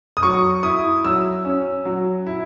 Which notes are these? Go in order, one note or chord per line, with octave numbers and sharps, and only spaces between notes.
D#6
F#3 C#6
E4 D#6
F#3 E6
C#4
F#3
E4